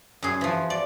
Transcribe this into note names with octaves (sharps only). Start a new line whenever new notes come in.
F#2 G#4
E3 F3
D5